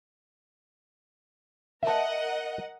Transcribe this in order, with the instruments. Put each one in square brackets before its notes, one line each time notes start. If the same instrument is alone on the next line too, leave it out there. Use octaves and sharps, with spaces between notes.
[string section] A#4 D#5 F#5 [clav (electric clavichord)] E5 A5